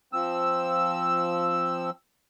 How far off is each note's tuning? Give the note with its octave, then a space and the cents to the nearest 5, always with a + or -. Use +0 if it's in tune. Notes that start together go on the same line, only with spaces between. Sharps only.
F3 +0 C4 +0 E6 +0